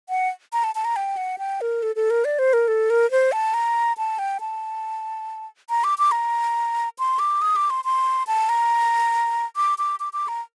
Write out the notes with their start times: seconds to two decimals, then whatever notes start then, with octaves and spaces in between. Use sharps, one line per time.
0.09 F#5
0.53 A#5
0.64 A5
0.75 A5
0.85 A#5
0.96 G5
1.17 F#5
1.38 G5
1.61 A#4
1.83 A4
1.96 A4
2.10 A#4
2.25 D5
2.39 C5
2.53 A#4
2.68 A4
2.90 A#4
3.11 C5
3.32 A5
3.54 A#5
3.98 A5
4.19 G5
4.40 A5
5.70 A#5
5.84 D6
5.98 D6
6.12 A#5
6.99 C6
7.19 D6
7.42 D#6
7.56 D6
7.70 C6
7.85 C6
8.27 A5
8.49 A#5
9.56 D6
9.78 D6
10.00 D6
10.13 D6
10.28 A#5